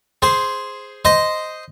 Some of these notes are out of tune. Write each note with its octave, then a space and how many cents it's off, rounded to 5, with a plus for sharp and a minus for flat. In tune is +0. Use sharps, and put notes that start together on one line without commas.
G#4 +0 C5 +0
C5 -10 D#5 +0